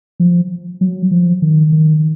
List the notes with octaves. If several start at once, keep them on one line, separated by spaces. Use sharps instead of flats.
F3
F#3
F3
D#3
D#3